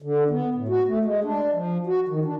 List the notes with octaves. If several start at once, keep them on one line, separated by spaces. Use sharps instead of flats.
D3
B3
A2
F#4
A3
G#3
D4
F3
F#4
D#3
D4